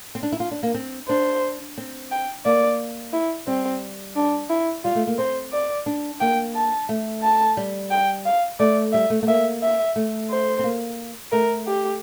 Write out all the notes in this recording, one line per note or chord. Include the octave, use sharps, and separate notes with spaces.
C4
D4
E4
F4
D4
A#3
C4
D4 C5
C4
G5
A#3 D5
E4
G3 C4
D4
E4
G3 F4
A3
A#3
C4 C5
D5
D4
A#3 G5
A5
A3
A5
G3
G5
F5
A3 D5
G3 E5
A3
A3
A#3 E5
E5
A3
C5
C4
A#3
A3 A#4
G4